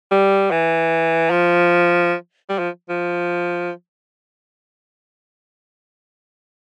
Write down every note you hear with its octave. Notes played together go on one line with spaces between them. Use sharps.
G3
E3
F3
G3
F3
F3